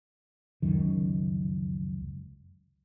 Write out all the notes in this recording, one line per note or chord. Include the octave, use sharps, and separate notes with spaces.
F1 C#2 F#2 D#3